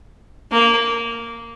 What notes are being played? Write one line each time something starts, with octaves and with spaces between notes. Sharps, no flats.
A#3